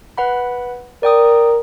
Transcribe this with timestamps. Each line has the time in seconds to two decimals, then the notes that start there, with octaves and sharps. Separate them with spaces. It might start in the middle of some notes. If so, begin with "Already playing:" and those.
0.18 B4 F#5 B5
1.03 A#4 D5 G5 D#6